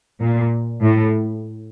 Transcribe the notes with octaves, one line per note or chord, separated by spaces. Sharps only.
A#2
A2